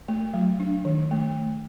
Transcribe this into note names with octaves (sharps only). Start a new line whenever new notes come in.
A3
F#3
D4
D#3
A3